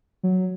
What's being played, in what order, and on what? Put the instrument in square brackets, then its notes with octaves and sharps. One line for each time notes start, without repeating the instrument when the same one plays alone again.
[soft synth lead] F#3